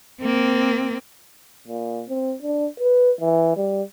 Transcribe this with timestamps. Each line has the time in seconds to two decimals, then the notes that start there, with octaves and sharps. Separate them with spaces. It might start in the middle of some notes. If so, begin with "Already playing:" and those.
0.22 A#3 C4
1.68 A#2
2.09 C4
2.42 D4
2.80 B4
3.21 E3
3.57 G3